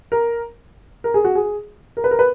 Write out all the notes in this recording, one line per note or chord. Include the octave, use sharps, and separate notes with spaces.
A#4
A#4
G#4
F#4
G#4
A#4
B4
A#4
B4